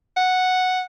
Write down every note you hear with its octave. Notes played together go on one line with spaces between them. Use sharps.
F#5